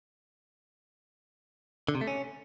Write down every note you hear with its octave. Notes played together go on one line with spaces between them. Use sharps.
D3
C3
A3
C#4